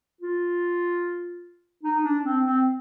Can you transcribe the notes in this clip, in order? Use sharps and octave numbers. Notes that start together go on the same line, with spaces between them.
F4
D#4
D4
C4
C4